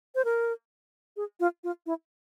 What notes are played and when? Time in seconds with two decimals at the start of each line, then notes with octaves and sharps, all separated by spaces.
0.15 C5
0.25 A#4
1.17 G#4
1.40 F4
1.64 F4
1.86 E4